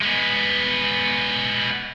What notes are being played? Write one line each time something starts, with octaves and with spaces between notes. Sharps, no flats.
G#3 B3